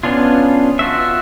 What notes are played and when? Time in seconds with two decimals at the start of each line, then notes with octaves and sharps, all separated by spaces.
0.03 B3 C#4 D4 F4
0.79 F4 F#4 E5